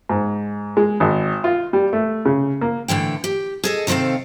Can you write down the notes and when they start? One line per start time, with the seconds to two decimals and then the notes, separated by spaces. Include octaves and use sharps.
0.09 G#2
0.77 G#3
1.00 G#1
1.44 F4
1.73 G3
1.93 A3
2.25 C#3
2.61 A#3
2.88 A2 D3 E3 G5
3.24 G4
3.64 G#4 A4 D#5
3.87 C3 D#3 C4 A4 F5